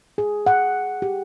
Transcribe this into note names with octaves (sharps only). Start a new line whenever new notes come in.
G#4
F#5
G4